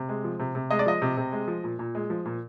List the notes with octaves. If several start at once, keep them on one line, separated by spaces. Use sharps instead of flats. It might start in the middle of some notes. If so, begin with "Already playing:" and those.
Already playing: C3
G#3
F3
C3
C3
G#3 D#5
D5
F3 D#5
C3
C3
G#3
F3
A#2
A#2
G#3
F3
A#2